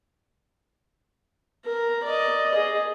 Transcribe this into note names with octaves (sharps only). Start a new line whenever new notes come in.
A#4
D5 D#5
G#4 D#5